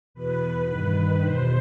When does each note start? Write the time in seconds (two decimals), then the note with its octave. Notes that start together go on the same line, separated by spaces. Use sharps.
0.14 E2 B2 B4
0.68 G2 D#3
1.21 E2 B2 C5